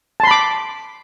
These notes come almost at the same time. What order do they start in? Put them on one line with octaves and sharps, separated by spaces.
A5 C6 B5 D6